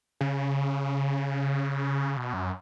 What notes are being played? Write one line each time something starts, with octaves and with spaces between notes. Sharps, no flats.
C#3
B2
F#2